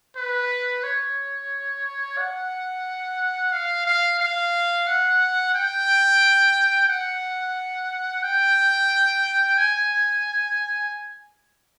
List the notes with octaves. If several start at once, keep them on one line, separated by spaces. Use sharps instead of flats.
B4
C#5
F#5
F5
F5
F5
F#5
G5
F#5
G5
G#5